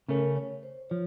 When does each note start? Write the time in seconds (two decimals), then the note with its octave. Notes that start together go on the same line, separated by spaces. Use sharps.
0.09 C#3 A3 C#4 A#4
0.36 C#5
0.63 C5
0.90 F3 C#5